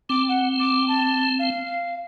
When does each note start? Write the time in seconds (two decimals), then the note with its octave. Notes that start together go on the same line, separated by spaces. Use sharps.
0.09 C4 D6
0.29 F#5
0.60 D6
0.88 A5
1.39 F5